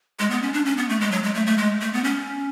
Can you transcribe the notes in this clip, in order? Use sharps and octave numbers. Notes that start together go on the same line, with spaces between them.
G#3
B3
C#4
D4
C#4
B3
A3
G#3
F#3
G#3
A3
A3
G#3
A3
B3
C#4